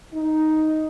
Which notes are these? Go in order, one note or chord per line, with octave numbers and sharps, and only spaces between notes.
D#4